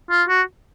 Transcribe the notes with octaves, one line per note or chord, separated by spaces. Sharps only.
F4
F#4